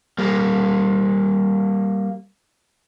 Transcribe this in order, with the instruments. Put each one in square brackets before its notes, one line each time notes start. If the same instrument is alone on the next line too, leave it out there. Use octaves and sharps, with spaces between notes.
[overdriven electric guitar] G3 A#3